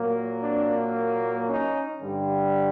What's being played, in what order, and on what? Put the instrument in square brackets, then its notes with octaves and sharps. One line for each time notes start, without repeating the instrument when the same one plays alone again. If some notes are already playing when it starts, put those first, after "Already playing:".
Already playing: [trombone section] A#2 F#3 A#3
C4 D4
C#4 D#4
G2 D3 G3